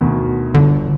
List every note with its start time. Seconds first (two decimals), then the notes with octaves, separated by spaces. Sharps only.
0.01 D2 B2 D#3
0.54 G1 D3